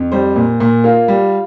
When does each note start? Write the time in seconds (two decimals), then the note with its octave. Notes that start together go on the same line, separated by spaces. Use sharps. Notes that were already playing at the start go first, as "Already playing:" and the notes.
Already playing: F2
0.12 G3 C5
0.36 A#2
0.60 A#2
0.84 A#3 F4
1.08 G3